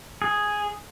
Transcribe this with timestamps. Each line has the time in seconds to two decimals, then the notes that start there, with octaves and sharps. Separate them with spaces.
0.22 G#4